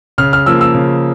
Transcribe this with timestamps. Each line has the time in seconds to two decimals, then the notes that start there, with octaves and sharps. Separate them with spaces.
0.18 C#3 F6
0.33 F6
0.46 F3 A#3 E6
0.61 E6
0.75 C#3